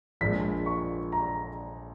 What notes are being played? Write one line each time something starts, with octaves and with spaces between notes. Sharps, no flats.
A#1 A#2 G#3 B6
C#6
A#5